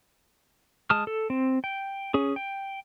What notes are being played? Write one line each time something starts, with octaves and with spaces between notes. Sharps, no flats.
G#3 A5 D#6 F6
A4
C4
G5
C#4 G#4
G5